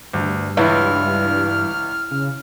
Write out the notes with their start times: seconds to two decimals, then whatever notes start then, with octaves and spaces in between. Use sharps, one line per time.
0.13 D2 G2
0.57 C#2 E3 E4 F6
2.11 C#3